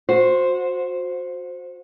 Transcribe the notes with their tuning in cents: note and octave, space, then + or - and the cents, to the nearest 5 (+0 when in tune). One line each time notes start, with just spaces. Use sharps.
F#4 -30 C5 +0